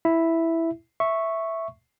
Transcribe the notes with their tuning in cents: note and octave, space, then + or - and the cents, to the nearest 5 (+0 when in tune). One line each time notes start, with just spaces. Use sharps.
E4 +0 E5 +0
E5 +0 C#6 -5